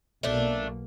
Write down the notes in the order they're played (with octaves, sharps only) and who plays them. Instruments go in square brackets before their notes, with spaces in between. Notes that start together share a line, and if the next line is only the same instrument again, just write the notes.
[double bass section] B1 B2 A#3 [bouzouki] A3 D4